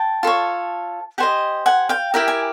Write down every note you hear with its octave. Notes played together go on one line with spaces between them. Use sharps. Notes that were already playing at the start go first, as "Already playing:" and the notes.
Already playing: G5 A5
F4 A4 C#5
G4 C5 D#5 F#5 G#5
F#5 G#5
F5 G5
E4 G4 A#4 G5
G#5